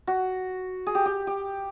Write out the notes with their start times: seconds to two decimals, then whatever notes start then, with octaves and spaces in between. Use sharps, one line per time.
0.07 F#4
0.87 G#4
0.95 G4
1.06 G4
1.27 G4